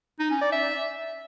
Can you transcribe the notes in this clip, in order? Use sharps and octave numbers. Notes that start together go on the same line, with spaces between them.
D#4
C#4
D5
E5